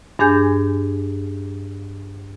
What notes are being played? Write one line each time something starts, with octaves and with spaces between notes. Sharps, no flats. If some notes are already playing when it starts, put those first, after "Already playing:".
G2 D4 G#4 G#5 G6